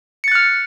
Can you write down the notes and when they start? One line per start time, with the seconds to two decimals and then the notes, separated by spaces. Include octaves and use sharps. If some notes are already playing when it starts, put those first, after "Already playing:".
0.24 C#7
0.28 A6
0.32 F#6
0.35 F6